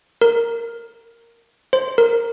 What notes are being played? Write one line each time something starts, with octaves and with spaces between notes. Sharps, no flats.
A#4
C5
A#4